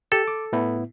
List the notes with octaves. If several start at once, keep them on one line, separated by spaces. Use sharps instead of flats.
G4 A4
D6
A2 B3 E4